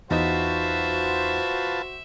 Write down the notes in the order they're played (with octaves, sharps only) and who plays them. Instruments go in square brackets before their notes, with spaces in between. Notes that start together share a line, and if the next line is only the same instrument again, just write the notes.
[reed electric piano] E2 D#4 [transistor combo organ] F4 B4 A5 [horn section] F#4 C5 [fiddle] E5